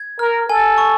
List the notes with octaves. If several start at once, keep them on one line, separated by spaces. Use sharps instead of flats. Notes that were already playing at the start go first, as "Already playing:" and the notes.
Already playing: G#6
A#4 F6
A4 G#5
C#6